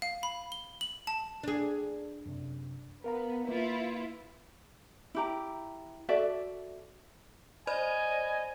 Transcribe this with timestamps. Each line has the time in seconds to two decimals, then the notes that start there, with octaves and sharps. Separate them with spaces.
0.02 F5
0.23 B5
0.52 G7
0.81 F#7
1.07 A5
1.43 D4 G#4
2.26 F#2 C3
3.04 B3 A#4 F5 A#5
3.47 A#3 E4 F4 B4
5.15 E4 G4 A#5
6.09 F#4 A4 D5 E5
7.67 C5 D5 D#5 G#5 B5